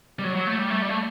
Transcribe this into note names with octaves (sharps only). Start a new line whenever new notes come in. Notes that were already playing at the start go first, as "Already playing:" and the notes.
G3
F#3
F#3
A3
G3
A3
G3
A3